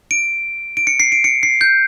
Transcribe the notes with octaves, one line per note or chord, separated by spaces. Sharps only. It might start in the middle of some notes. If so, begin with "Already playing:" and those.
D7
D7
C#7
C7
D7
C#7
C7
G6